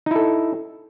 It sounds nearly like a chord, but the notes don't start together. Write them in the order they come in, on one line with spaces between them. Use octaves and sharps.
D#4 E4 A4